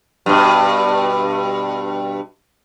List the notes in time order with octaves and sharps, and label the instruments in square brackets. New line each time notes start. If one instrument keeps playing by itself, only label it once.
[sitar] G2 B2